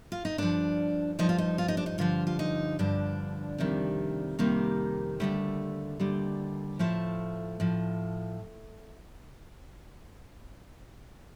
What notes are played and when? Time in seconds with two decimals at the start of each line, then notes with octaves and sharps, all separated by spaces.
0.12 F4
0.25 D#4
0.38 G2 F3 D4
1.19 G2 F3 D#4
1.29 F4
1.38 D#4
1.58 F4
1.68 D#4
1.77 D4
1.86 D#4
1.98 G2 D3 F3 F4
2.27 F4
2.39 D#4
2.79 G2 D3 F3 D4
3.58 F2 C3 D#3 G3
4.39 F2 C3 D#3 G3 A#3
5.20 D#2 D3 G3 A3
6.00 D#2 D3 G3
6.79 A2 F3 A3
7.60 A2 F3